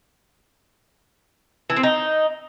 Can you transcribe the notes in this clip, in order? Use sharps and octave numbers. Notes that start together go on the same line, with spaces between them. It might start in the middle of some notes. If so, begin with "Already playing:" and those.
E3
C4
D#4